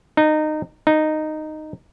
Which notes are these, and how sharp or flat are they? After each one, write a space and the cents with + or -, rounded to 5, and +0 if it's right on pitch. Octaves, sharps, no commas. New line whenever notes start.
D#4 -20
D#4 -10